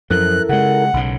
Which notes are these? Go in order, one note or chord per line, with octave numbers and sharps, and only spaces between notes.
F#2 F3 E4 A4 A#4 F#6
C#3 G#3 F#5
B1 C#3